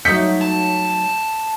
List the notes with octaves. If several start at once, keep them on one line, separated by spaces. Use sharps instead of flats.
F#3 A3 D#4 G6 B6 C#7
A5